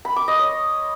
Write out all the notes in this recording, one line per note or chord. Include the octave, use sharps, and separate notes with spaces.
B5
D6
D#5
C#5